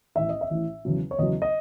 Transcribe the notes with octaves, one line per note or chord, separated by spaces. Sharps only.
A1 A2 E3 E5
D#5
E5
A1 A2 E3
E2 C#3 F#3
C#5
E2 C#3 F#3 D#5
D#5